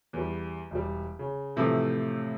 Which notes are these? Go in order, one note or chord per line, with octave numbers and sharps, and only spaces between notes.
E2 G3
E1 G3
C#3
A2 C3 E3 F3 A3